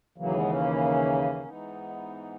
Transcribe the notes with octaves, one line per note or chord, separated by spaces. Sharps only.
D#2 C#3 E3 F#3 A#3
G#3 B3
A#3 C#4
G#2 E3 B3 D#4